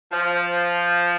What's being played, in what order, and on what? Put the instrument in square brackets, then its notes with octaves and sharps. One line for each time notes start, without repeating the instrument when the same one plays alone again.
[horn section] F3